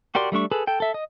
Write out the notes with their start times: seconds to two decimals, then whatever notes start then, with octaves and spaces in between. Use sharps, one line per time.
0.15 F#4 G4 A#4 D5 C6
0.32 G3 A3 D4 C#6
0.51 G#4 A4 B4
0.67 A4 G5
0.80 A4 E5
0.94 D#5